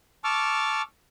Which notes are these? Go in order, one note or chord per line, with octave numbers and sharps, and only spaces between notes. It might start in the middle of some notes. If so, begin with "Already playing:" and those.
A5 C#6 D6 E6 F6